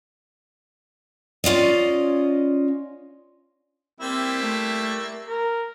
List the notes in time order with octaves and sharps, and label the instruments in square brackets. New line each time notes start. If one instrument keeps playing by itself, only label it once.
[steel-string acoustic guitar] C#4 F4 D5 D#5
[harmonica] G3 A#3 E4 [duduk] C4
[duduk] A3
A#4